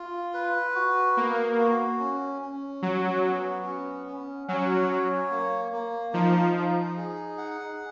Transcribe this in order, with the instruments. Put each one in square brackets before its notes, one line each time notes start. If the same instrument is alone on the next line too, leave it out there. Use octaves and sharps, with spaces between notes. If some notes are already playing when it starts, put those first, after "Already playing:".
Already playing: [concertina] F4
B4
F#4
[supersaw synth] A#3 [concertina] B3
[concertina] F#4
C#4
C#4
[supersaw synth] F#3 [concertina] F#4
[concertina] B3
C#4
C#4
[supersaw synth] F#3 [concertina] C#4
[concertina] C#5
A#3
A#3
[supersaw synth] F3 [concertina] D#4
[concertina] D#4
G#4
F#5